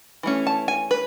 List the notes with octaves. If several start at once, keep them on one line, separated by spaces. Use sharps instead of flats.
E3 A3 C#4
A5
G#5
B4